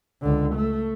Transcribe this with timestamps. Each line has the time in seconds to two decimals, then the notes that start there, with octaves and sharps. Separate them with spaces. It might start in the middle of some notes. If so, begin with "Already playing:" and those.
0.22 C#2 D3
0.55 A3